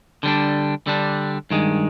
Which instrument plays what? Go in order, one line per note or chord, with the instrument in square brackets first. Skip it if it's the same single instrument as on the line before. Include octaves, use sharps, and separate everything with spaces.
[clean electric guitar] D3 G3 D4
D3 G3 D4
G2 D#3 G#3